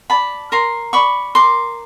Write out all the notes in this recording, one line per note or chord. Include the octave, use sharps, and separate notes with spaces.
D5 A5 B5
A#4 A#5 C6
D5 B5 C#6
A#4 C6 D6